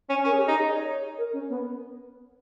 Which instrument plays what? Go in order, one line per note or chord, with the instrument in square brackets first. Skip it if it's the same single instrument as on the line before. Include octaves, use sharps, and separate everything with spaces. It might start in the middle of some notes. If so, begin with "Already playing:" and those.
[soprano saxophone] C#4
[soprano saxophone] C#4 [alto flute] A#4
[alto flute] G#4
G4
[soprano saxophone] D#4 [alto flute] G#4
[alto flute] D#5
C#5
A#4
C#4
B3